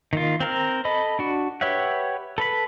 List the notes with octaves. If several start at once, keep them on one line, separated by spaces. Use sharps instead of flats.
D#3 A#3 F4
C4 A#4 F6
A4 D#5 B5
D4 F#4
G4 B4 C#5 E5 F#5
A4 B4 B5